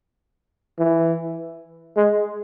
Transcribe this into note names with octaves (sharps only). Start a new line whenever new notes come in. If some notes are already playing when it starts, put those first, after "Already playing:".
E3
G#3